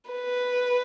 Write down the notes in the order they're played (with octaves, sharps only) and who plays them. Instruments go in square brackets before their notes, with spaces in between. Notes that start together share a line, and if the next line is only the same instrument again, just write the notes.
[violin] B4